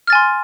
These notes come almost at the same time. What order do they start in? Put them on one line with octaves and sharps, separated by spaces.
F6 A6 G#5 C6